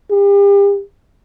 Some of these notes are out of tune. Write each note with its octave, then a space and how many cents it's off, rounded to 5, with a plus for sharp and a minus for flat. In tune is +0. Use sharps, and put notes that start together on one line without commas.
G4 +40